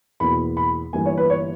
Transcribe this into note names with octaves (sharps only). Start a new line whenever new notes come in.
E2 B2 A#3 B5
B5
G1 G2 E3 A#3 G#5
C#5
B4
C#5